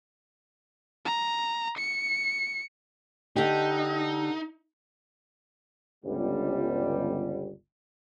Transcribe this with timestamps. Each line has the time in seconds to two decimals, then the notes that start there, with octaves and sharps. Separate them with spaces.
1.06 A#5
1.78 C#7
3.36 D3 D#4 G4
6.05 G1 C#2 G3